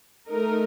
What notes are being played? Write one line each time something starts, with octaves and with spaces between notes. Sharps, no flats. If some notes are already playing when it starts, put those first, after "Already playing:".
A3 D#4 A#4